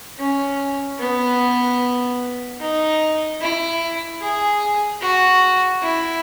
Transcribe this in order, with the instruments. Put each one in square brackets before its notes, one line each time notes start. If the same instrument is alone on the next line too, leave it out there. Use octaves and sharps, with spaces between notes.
[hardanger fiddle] C#4
B3
D#4
E4
G#4
F#4
E4